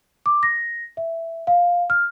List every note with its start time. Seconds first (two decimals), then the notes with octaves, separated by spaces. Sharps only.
0.26 D6
0.43 A#6
0.97 E5
1.47 F5
1.90 F6